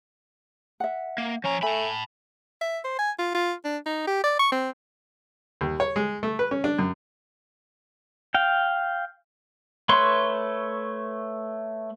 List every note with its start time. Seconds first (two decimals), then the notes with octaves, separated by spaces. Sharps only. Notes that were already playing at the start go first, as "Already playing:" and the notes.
0.80 E5 F#5
1.18 A#3
1.44 F3 C#4 A#5
1.63 A3 G#5 A5 B5
2.61 E5
2.84 C5
2.99 G#5
3.19 F4
3.34 F4
3.64 D4
3.86 D#4
4.07 G4
4.24 D5
4.39 C#6
4.52 C4
5.61 D#2
5.80 C#5
5.96 G#3
6.23 A3
6.39 B4
6.51 C#4
6.64 D4
6.79 F#2
8.34 F5 G5
9.89 A3 B4 C#5 C6